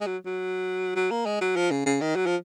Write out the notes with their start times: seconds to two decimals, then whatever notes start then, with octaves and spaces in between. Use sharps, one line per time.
0.01 G#3
0.06 F#3
0.26 F#3
0.96 F#3
1.11 A#3
1.26 G#3
1.41 F#3
1.56 F3
1.71 C#3
1.86 C#3
2.01 D#3
2.16 F#3
2.26 F3